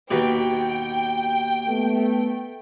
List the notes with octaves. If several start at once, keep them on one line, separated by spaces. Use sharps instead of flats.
D#2 B2 G5
A3 B3